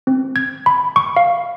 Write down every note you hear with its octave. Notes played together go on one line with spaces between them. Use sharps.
C4
G#6
B5
C#6
F5